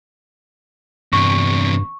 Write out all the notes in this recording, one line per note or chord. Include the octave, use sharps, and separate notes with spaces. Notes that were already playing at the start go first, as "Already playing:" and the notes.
E2 G2 C3 C#6